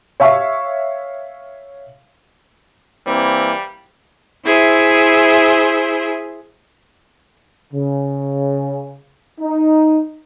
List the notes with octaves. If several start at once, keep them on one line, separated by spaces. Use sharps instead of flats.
C#5 E5 F5 C#6
E3 G3 A#3 C4
E4 G#4 C5 E5
C#3
D#4